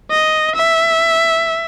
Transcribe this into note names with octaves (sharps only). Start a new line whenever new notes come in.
D#5
E5